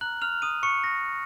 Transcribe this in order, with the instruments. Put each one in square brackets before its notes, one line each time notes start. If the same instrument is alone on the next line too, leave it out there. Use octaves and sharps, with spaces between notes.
[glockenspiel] A#5 F6 F#6 F#7
F6 F7
D#6 D#7
C#6 C#7
A#6